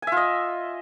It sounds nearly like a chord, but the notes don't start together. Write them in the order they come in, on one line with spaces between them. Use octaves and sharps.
G#5 E5 F4 D#5